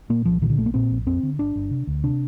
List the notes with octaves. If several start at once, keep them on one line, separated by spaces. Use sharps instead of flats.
A#2 A#3
C2 F3
A#2 D#3
D3
A#1 A3
A#3
A#2 C4
A#1
F2 C4
D3
G1 D4
G1
C3
D2
C3 D4